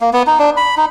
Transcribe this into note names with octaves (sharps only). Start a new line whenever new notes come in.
A#3
B3
D#4
D4
B5
D#4